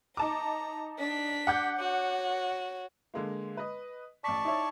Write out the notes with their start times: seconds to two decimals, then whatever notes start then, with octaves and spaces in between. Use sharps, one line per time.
0.17 D#4 A5 A#5 D6
0.98 D4 B6
1.47 F#5 D6 G6
1.79 F#4 C#5
3.14 D3 G#3 A#3
3.57 B4 D#5
4.24 A1 D5 A5 C#6 B6
4.44 D#4 E4 C#5